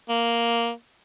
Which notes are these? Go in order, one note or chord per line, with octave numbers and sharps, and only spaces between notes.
A#3